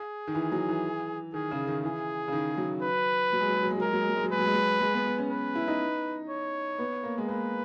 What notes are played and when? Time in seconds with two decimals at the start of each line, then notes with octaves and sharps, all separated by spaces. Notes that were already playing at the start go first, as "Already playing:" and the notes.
Already playing: G#4
0.27 D#3
0.35 E3
0.52 F#3
0.68 E3
1.34 D#3 G#4
1.51 C#3
1.67 D#3
1.84 E3 G#4
2.28 C#3
2.33 D#3
2.57 F#3
2.82 B4
3.33 F#3
3.40 G#3
3.48 F#3
3.56 G#3
3.63 F#3
3.71 G#3
3.78 F#3
3.81 G#3 A#4
3.93 F#3
4.01 G#3
4.08 F#3
4.16 G#3
4.24 F#3
4.32 G#3 B4
4.38 F#3
4.46 G#3
4.54 F#3
4.80 G#3
4.93 B3
5.06 B3
5.18 C#4
5.30 B4
5.55 E4
5.68 D#4
6.29 C#5
6.79 B3
7.03 A#3
7.18 G#3
7.28 A#3 B4